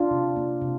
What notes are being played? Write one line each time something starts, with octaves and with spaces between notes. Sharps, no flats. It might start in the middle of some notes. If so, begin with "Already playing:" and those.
Already playing: D4 F4
C3
A#3
C3